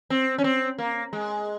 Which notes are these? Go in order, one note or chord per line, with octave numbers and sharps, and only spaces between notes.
C4
C#4
C4
A#3
G#3